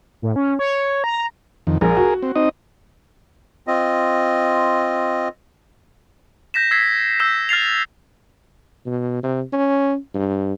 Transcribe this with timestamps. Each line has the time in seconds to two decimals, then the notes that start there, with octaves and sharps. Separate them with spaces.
0.22 A2
0.36 C#4
0.59 C#5
1.04 A#5
1.67 F2 D#3
1.81 A#1 G#4 A#4
1.97 F#4
2.22 C4
2.36 C4 D#4 D#5
3.67 C4 F4 D#5
6.54 G6 A#6 B6 E7
6.71 E6 G#6 B6 C7
7.20 E6 G6 B6 E7
7.49 F6 A6 C7 F7
8.86 B2
9.24 C3
9.53 C#4
10.15 G2